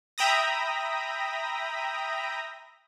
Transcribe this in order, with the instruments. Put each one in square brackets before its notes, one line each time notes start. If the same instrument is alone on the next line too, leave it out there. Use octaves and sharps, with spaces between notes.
[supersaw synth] E5 G5 A#5 B5 D#6 A#6